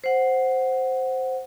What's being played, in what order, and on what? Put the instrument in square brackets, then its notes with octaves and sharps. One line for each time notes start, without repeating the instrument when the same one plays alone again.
[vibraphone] C5 F#5